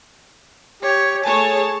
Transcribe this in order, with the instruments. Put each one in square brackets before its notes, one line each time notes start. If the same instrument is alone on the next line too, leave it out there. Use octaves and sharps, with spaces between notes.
[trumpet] G4 [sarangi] C#5
[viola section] A3 G#4 C#5 [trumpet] G#5 [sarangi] A5